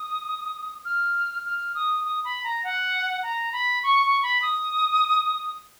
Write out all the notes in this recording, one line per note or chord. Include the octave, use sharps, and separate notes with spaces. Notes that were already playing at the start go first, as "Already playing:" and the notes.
Already playing: D#6
F6
F6
D#6
D#6
B5
A#5
F#5
A#5
B5
C#6
C#6
B5
D#6